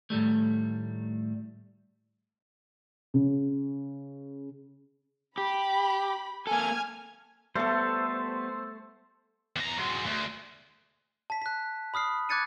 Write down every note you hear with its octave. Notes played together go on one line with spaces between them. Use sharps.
A2 D#3 G3 A3
C#3
G4 B5
A#3 A4 G#5 F6 G#6
G3 A3 B3 A4 C5
E2 A#5
F#3 G#3
D2
A5 B6
F#6 B6
B5 D#6 F6 C7
D6 F#6 G#6 A6 C#7 D#7